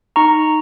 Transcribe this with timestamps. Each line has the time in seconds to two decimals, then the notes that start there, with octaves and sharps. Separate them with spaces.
0.16 D#4 A#5 C#6